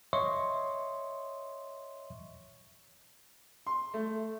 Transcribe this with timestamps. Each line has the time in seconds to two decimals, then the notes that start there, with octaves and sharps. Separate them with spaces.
0.13 C#5 D#5 E5 C6 C#6
3.67 C6
3.94 A3